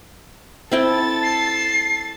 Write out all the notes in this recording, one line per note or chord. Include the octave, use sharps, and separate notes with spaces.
C4 E4 A4 G5 A6
C7